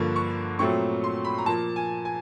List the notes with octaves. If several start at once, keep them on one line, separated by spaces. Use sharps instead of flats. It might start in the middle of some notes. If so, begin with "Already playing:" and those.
Already playing: G2 D3 F3 A#3 C#6
C#6
A#2 F#3 A3 C4 C#6
C6
B5
A#5
A#2 F3 A#3 A5
G#5
G#5